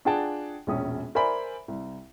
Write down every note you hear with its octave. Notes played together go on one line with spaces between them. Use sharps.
D4 F4 G#4 F#5 G5 A5
E1 A#1 C#4 D#6
A#4 C5 D5 E5 G#5 B5
C2